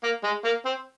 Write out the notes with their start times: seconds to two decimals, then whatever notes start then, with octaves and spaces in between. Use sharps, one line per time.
0.03 A#3
0.24 G#3
0.44 A#3
0.65 C4